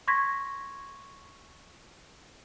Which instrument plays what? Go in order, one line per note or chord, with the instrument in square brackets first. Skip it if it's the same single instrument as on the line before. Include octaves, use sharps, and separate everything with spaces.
[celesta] C6 C#6 G#6 A#6 B6